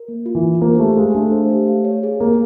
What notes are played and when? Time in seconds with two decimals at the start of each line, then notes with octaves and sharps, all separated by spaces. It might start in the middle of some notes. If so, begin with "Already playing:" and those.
Already playing: A#4
0.08 A#3
0.26 F4
0.35 E3
0.44 D4
0.61 A#3 C5
0.79 A3 G4
0.96 G#3 F5
1.14 A3 D4
1.32 C5
1.50 G4
1.67 F5
1.85 C#5
2.03 G#4
2.20 A#3 G#4